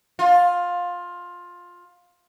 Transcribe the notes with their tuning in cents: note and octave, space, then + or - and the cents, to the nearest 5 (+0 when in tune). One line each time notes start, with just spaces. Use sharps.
F4 +15